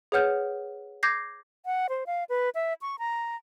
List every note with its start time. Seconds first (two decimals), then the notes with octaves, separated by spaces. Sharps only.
0.12 G#4 B4 C#5 F#5 F6 G6
1.03 D6 G6 G#6 A#6 C7
1.66 F#5
1.89 C5
2.07 F5
2.29 B4
2.55 E5
2.82 C#6
2.99 A#5